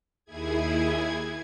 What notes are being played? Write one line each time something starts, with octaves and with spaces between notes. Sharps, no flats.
D#2 E4 G#4 G#6